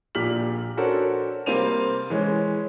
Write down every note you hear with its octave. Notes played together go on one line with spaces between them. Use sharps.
A#1 A#2 G4 F6 B6 F#7
C#4 D4 F#4 A4 A#4 C5
C3 G3 A#3 C4 D#7 F7
E3 G#3 C#4